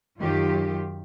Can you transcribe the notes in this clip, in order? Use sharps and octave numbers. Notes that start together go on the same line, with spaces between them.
F#2 D#3 F#3 F4 G4